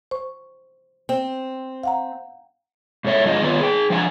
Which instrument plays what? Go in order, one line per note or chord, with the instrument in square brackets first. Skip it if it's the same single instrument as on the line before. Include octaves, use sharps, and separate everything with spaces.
[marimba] C5 C#6
[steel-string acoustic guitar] C4
[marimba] F5 F#5 A#5
[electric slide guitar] G#2 A3 C#5 E5
G2 F3 G#3 D4 F4 D#5
D#3 B3 F4 B4 C#5
G#4 G5
F3 D4 F5 F#5 G#5